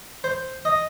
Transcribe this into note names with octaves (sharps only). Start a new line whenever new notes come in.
C5
D#5